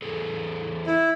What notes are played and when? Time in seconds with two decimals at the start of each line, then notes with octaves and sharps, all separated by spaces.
0.02 E2 G#4 A4
0.87 E4